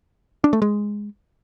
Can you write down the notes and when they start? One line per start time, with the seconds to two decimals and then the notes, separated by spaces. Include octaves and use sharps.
0.44 D4
0.53 A3
0.62 G#3